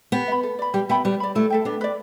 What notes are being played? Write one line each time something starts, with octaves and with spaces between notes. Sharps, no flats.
B3 G4
E5
B5
A4
D5 B5
G3 G4
B3 E5 G5 B5
G3 B4
D5 B5
A3 E4
A4 E5 G5
B3 D4
B4 D5